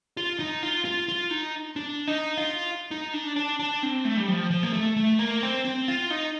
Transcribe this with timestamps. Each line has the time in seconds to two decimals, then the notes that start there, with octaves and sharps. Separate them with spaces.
0.17 F4
0.39 D#4
0.63 F4
0.85 F4
1.09 F4
1.31 D#4
1.76 D4
2.08 D#4
2.37 F4
2.91 D#4
3.13 D4
3.36 D4
3.59 D4
3.83 C4
4.05 A3
4.17 G3
4.28 F3
4.51 F3
4.63 A#3
4.73 A3
4.97 A3
5.19 A#3
5.42 C4
5.65 C4
5.88 F4
6.10 D#4